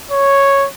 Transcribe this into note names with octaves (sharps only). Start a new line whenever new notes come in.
C#5